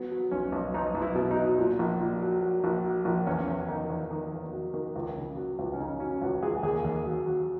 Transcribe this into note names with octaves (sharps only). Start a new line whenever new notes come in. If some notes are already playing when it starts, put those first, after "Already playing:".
Already playing: F#3 B3
F#3
B1 C#4
B1
B1 D#4
B1
E4
B2
D#4
F#3
A#2
A#1
A#2
F#3
F#3
A#1
F#3
A#1
E2 C#4
E2
D#3 D#4
E2
D#3
E2
F#3
D#3
C#2
C#3
F#3
C#2
C#4
C#3 D#4
F#3 C#4
C#2 F#4
C#2 G#4
D#2 G#4
D#2
F#3
F#3